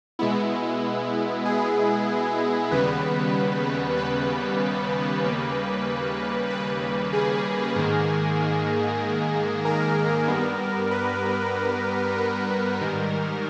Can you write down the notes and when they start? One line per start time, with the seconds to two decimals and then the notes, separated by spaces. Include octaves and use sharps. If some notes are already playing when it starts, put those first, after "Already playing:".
0.19 B2 G#3 B3 E4
1.46 G#4
2.71 D#2 C#3 G3 B3 B4
3.98 B4
5.24 D#2 C#3 G3 A#3
6.50 B4
7.13 G#4
7.76 G#2 D#3 A#3
9.65 A#4
10.28 G2 G3 B3
10.91 B4
12.17 A#4
12.81 G#2 D#3 G3